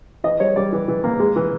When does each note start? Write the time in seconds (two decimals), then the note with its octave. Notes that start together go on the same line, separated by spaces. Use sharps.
0.24 E3 D#5
0.40 G3 C#5
0.56 G3 D5
0.72 E3
0.88 E3
1.04 A#3
1.20 G#3
1.36 E3